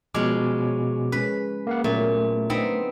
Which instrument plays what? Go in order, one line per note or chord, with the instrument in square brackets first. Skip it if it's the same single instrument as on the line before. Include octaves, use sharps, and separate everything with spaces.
[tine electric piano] B2 D6 [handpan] F3 [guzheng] G#3 C#4
[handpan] G#3 C#4 [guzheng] B4
[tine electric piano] A#3 F5 F#5
[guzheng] A#2 [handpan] F#3 B3 C#4 [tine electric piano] A3
[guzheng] B3 C4 [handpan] D4 D#4